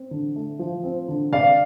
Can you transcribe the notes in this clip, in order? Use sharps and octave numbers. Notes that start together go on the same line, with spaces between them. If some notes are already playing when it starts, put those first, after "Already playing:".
Already playing: C4
D3
A3
F3
C4
D3
C3 D5 F5